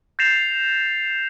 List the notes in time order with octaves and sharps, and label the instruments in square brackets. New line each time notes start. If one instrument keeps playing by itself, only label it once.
[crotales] G6 A6 A#6 C7 E7 F7